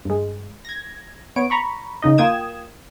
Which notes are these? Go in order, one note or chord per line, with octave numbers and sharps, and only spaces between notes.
G2 G#3
G#6 A#6
B3 C#5 D7
A#5 B5 C#6
C#3 D#4 D#5
A#3 F4 G5 D#6 G#6 E7